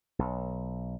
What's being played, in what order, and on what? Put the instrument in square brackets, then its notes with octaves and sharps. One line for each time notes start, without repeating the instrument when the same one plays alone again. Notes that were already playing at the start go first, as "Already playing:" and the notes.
[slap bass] B1